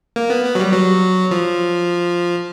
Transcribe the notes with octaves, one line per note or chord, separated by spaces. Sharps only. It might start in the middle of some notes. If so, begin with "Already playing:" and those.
A#3
B3
B3
F#3
G3
F#3
F3